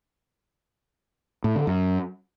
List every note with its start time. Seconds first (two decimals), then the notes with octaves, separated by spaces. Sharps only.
1.44 A2
1.56 D3
1.67 F#2